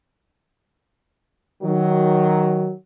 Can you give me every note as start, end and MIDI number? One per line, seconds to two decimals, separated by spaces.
1.62 2.71 51
1.62 2.71 54